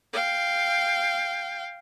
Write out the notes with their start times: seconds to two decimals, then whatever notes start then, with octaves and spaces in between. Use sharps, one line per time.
0.13 F5 G5